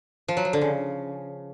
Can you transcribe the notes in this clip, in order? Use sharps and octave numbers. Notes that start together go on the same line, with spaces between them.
F3
F#3
F3
D3
C#3